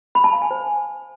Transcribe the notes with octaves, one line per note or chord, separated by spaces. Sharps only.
B5
A5
F5
G#5
C5